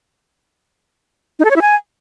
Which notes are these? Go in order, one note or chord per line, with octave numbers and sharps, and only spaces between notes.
D#4
A4
C#5
E4
G#5